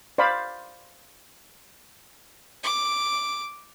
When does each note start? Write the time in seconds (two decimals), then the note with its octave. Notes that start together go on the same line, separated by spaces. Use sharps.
0.18 C5 D5 F5 B5
2.63 D6